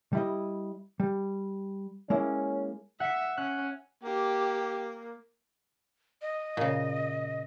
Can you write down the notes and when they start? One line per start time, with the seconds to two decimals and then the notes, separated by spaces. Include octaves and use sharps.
0.13 G3 E4 D#5
1.00 G3
2.10 G#3 A#3 C#4 E4
3.00 E5 F#5 C#7
3.37 C#4 F#6
4.04 A#3 G4
6.22 D#5
6.57 A#2 C#3